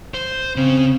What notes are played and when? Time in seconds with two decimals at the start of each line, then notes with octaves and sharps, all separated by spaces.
0.14 C5
0.56 C#3 C4